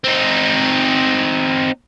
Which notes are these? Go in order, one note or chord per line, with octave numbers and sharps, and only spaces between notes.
C4 D#4